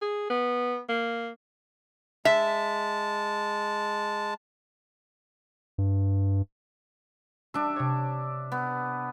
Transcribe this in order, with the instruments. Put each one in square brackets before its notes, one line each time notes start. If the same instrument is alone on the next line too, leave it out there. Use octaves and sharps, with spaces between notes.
[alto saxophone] G#4
B3
A#3
[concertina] G#3 A5 [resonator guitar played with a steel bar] E5
[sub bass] G2
[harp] G3 [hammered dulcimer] D4 E5
[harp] C3 C#5
[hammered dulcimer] B3